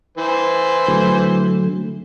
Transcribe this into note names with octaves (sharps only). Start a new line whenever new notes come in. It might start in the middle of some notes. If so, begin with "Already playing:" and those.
E3 C5
D3 F#3 A3